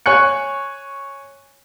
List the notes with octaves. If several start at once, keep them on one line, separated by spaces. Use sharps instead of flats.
C#5 G#5 C#6 F#6 C#7